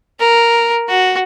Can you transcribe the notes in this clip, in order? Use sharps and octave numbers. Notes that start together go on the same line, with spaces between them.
A#4
F#4